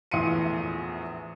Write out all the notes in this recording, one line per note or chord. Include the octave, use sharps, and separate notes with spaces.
A#1 E2 A2 C6 C#7 D#7